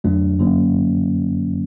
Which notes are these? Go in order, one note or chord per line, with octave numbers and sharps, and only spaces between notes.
F2 D3 F#3 A3 D4
F#2 D3 F#3 A#3 C#4